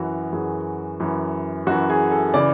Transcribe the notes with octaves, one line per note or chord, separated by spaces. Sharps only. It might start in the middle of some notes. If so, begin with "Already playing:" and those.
Already playing: F#2 E3 F#4
F#2 E3 G#4
F#2 E3
F#2 E3 F#4
G#4
A4
C#3 E3 D5